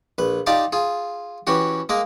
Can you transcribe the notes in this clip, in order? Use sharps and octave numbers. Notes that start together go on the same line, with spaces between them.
A#1 B4
D#4 F4 G4 D5 F5 A5
F4 G#4
E3 C#4 F#4 G4
G#3 A#3 G#4 A#4